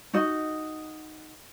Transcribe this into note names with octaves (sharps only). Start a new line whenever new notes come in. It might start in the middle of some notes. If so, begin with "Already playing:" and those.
D#4 F#4 D#5